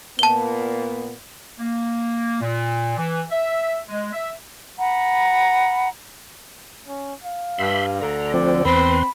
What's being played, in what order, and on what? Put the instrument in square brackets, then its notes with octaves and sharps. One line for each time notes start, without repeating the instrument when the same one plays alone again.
[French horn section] A#2 A#3 B3 [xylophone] A5 G7
[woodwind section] A#3
A#2
E3
E5
G#3
E5
[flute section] F#5 A#5 B5
[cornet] C#4
F5
[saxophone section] G2 [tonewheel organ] E5 B5 C6
[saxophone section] D2 D3 [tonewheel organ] A#5
[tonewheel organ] F3 C4 [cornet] D5
[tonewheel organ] E2 B4 C6 [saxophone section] C4 [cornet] B5